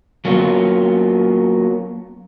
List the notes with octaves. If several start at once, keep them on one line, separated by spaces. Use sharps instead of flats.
F#3 A#3 B3 C#4 F4